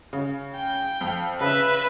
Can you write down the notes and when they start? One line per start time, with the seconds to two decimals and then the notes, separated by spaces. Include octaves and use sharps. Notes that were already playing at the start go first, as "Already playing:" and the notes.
0.13 C#3
0.56 G5
1.01 F2
1.41 C#3 B4 E5